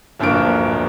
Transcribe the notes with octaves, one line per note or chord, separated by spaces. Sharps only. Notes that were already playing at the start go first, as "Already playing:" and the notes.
D1 A#1 G2 A#3 A#4 D7